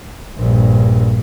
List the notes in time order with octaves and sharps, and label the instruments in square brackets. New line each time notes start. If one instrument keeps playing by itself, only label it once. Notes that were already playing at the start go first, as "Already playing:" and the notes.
[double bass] A#1 G2